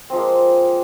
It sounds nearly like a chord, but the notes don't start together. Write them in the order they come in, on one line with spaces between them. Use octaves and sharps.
C4 F3 G#3 A#3